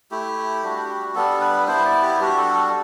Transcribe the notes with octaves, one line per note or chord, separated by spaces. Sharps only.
A3 E4 G4
G3 D4 F#4
G3 B3 D4 A4
B4
B3 E4 C5
D5
G4
G3 D4 F#4 G4
A4
A4